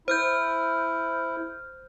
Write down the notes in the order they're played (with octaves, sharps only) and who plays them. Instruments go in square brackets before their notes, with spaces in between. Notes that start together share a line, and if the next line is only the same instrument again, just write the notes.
[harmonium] E4 [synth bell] C5 F6 G6